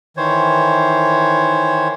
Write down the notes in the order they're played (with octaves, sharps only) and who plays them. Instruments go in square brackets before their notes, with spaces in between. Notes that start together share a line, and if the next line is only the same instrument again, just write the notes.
[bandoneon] D#3 E3 C5 C#5